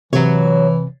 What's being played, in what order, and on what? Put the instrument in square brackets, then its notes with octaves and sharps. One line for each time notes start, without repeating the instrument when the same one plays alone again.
[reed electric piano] C3 [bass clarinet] E3 [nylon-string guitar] F#3 C#5